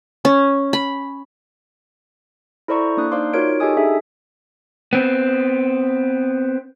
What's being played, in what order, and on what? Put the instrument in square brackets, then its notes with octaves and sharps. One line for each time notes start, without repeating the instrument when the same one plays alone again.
[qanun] C#4
B5
[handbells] E4 A4 C5 D5 A#5 C#6
A#3 D4 D#6 F#6
D#4 C5 D5 F5 C6 D6
D#4 F4 F#4 A#4 C#5 D7
D#4 G4 A4 D#5 G#5 D#6
D4 G#4 E5
[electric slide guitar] B3 C4